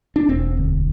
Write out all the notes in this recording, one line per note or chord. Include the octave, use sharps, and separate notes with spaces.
D4
E1 C4
D2